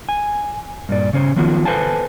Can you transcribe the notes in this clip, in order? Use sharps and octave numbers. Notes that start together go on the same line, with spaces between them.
G#5
G2 A#2 D5
C#3 C#4 C5 C#5
D#3 F3 F#3 B3 F4 F#4
A4 B4 C5 F5 G#5 A5